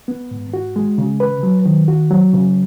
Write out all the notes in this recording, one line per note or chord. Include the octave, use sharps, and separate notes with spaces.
B3
G#2
F#4
G#3
C#3
B4
F#3
D#3
F#4
F#3
C#3